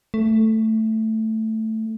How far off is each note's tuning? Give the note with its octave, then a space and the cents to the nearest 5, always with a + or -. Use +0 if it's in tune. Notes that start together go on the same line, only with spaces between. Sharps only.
A3 +5